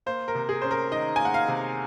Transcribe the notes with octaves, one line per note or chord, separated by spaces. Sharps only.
A#3 C5
A#4
C3
G#4
C#4 C5
A#4
D#3 D#5
A#3 G#5
F#5
F5
C3